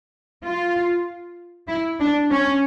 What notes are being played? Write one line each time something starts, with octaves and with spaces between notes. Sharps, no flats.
F4
E4
D4
C#4